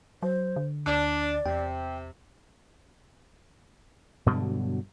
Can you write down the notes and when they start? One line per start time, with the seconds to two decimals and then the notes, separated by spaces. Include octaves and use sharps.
0.22 F#3 C5
0.56 D3
0.87 D2 D4 D5
1.46 E2 C3 G5
4.26 G2 B2 D3 F#3